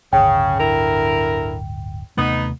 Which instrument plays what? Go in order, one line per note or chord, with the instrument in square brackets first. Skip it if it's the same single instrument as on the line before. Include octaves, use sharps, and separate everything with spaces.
[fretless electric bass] D1 G1 [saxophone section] C#3 [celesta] G5
[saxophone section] D3 E4 A#4
[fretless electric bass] D#2 C3 A3 [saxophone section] B3 D#4